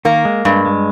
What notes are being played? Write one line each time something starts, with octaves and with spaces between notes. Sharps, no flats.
D#3 A#3
G#3
G2 G#3
G#3